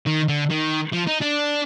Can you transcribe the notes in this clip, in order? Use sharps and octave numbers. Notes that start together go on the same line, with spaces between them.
D#3
D3
D#3
F3
D#4
D4